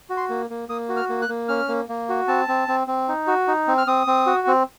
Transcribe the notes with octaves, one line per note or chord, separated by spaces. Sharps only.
F#4
C6
A#3
A#3
A#3 D#6
F#4
F6
A#3
F#6
A#3
C#4 F6
A#3
A#3
F#4
C4 A5
C4
C4
C4
D#4
F#4
D#4
C4
F6
C4 D#6
C4
F#4
C4